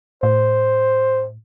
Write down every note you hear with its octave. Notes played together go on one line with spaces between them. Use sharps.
A2 C5